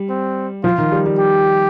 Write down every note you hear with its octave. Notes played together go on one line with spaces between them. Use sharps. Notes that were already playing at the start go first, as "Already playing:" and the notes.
Already playing: G3
C4
F3 F4
D#3
G3
G3
G4